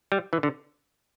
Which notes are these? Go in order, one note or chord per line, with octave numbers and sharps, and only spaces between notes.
G3
E3
D3